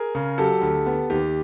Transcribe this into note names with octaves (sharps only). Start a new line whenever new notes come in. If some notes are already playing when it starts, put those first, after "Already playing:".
Already playing: G#4 A#4
C#3
F#3 G4 A4
D2
B3
D#2 G4